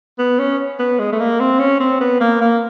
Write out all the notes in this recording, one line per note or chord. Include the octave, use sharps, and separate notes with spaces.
B3
C#4
B3
G#3
A3
A#3
C4
C#4
C4
B3
A#3
A#3